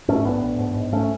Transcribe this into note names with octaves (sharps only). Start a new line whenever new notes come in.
G#2 A3 C#4
A1 B3 D4
A1
G#2
G#2
A3 C#4